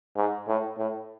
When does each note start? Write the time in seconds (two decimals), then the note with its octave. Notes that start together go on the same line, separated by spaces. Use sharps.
0.17 G#2
0.48 A2
0.78 A2